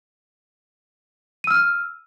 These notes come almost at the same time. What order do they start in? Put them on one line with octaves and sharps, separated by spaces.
D#7 E6 F6